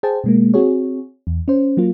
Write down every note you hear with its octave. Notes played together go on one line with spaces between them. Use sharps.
G#4 C5 G5 A5
B2 G#3 A#3
C4 F#4 G#4 C#5
E2
C#4 C5
F#3 A#3 F4